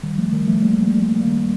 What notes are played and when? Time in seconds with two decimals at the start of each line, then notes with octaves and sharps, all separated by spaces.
0.03 D#3 G3
0.18 F3 A3
0.32 D#3 G3
0.47 F3 A3
0.63 G3 A#3
0.82 G3 A#3
1.02 G3 A#3
1.21 G3 A#3